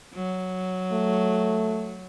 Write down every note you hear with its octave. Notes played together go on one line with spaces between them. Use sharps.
F#3
A3